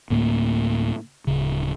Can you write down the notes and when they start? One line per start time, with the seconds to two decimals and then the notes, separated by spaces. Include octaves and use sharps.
0.10 D2 A2 A#3
1.27 D1 C#3